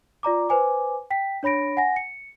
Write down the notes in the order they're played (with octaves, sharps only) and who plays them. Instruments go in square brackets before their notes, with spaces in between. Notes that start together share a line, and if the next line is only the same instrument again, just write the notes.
[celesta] F4 D5 A#5 D6
B4 C5 G#5 D6
G5 B6
D4 C#5 B5 A#6 D7
F#5 G#5 A#6
C#7